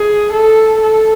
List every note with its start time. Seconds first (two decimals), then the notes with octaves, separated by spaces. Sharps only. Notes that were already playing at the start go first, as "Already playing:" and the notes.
Already playing: G#4
0.33 A4
0.82 A4